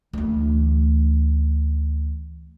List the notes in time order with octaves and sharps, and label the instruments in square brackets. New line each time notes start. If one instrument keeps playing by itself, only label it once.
[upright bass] D2 E3